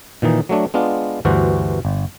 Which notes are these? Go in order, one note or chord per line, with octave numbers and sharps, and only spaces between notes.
A#2 D#3 E3 D#4
F#3 A3 D4
G#3 B3 D4 F4
D2 G2 E3 F#4 C5
G1